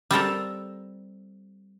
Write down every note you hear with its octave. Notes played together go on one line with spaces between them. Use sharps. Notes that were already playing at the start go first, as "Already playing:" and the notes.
G3 C4 A4 A#4